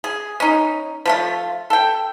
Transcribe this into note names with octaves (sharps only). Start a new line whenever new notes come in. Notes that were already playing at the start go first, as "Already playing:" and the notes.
G#4
C#4 D#4
F3 A3 F4
A4 G5